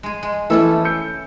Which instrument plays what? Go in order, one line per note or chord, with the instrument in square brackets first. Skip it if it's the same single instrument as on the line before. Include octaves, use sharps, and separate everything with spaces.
[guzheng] G#3 G#4
G#3
[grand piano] E3 A3 E6 [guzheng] C#4 E4 A4
[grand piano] E6 G6 C#7